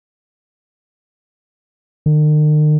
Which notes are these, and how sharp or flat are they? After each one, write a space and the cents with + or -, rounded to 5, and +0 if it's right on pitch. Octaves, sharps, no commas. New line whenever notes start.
D#3 -45